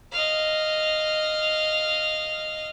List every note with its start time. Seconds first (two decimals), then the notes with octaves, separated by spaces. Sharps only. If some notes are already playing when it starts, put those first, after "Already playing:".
0.12 D#5 F5